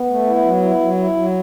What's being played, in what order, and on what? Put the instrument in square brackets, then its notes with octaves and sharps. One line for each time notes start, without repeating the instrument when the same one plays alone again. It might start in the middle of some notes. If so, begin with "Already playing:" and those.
Already playing: [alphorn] B3
[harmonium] A3
E4
F#3
E4
F#3
E4
F#3